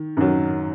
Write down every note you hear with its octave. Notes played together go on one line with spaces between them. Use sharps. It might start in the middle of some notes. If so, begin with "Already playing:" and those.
Already playing: D#3
F#2 D#3 F#3